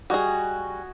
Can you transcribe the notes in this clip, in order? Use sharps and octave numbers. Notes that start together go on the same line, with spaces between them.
G3 F#4 G#4 D#5 G#5